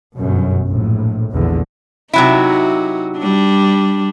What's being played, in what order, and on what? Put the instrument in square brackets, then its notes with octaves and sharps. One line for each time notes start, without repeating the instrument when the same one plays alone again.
[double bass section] G1 F#2 B2
A#1 A2
A#1 E2 G#2 D3
[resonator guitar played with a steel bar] C3 F#3 E4 [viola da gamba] D#4 F#4
[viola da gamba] G3 D4